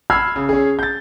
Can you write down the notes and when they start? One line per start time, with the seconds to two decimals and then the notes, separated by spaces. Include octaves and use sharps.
0.10 B5 E6 F6 G#6 C7
0.36 C#3
0.49 C#4 G#4
0.79 G6 A6